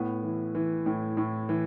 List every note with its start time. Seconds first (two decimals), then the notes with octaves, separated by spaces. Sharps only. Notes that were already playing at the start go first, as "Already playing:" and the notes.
Already playing: A2 B3
0.23 E3
0.55 E3
0.86 A2
1.17 A2
1.49 E3